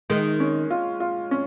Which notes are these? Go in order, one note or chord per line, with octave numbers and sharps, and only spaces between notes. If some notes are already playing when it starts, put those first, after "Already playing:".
D#3 G#3
C#4
F4
F4
C#4